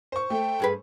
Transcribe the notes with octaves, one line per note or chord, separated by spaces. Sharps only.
C5 C#6
A3 G5
G2 G#4 B4